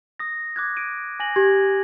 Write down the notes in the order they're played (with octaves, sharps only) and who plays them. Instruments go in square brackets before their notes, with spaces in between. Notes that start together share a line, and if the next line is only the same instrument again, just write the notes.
[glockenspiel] D#6 A#6
D6 F#6 G#6
D7 D#7
G#5 A#6 F#7
[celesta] G4 [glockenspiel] G#6